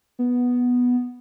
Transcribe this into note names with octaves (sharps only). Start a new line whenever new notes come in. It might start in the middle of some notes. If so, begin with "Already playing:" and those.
B3